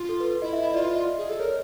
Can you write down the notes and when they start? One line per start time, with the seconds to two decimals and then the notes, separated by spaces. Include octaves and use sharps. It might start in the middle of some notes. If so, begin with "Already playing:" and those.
Already playing: F4
0.09 A4
0.20 B4
0.31 B4
0.42 E4 D#5
0.53 E5
0.64 D#5
0.74 F4 D5
0.85 E5
0.96 D#5
1.17 G#4
1.29 A4
1.40 A#4 C#5